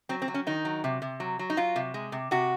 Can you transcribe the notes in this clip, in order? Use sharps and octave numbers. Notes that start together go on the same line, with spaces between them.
F#3 C4
C4
F#3
C#4
D#3 D#4
F#3
C3
C3
F#3
F#3
D#4
F#3 F4
C3
G#3
C3
C3 F#4